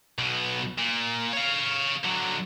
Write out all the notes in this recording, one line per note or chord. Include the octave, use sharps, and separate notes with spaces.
B1 B2
A#2
C#5 F5
D3 F#3